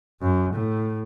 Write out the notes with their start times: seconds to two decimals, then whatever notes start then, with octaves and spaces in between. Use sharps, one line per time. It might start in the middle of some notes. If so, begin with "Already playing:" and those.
0.21 F#2
0.54 A2